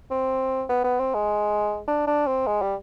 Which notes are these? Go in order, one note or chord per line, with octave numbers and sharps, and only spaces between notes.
C4
B3
B3
C4
G#3
D4
D4
C4
G#3
G3